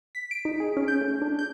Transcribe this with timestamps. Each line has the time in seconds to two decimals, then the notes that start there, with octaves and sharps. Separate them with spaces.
0.15 B6
0.31 D7
0.45 D#4
0.60 G#4
0.77 C#4
0.88 G6
1.01 A3
1.22 D4
1.39 G6